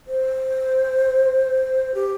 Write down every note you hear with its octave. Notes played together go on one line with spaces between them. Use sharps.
C5
G4